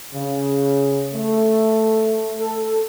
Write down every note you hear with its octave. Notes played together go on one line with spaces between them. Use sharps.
C#3
A3
A4